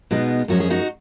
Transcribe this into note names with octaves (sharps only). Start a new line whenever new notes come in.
B2 G#3 B3 D#4
F#2 F3 G#3 C#4 F#4
G#4
D#4 F#4